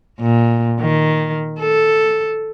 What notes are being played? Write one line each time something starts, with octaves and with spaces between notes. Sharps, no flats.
A#2
D#3
A4